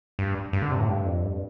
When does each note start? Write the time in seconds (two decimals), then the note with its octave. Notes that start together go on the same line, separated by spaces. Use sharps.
0.19 G2
0.53 G2
0.62 D3
0.71 C3
0.76 G2
0.80 A2
0.88 G2
1.06 F2
1.23 G2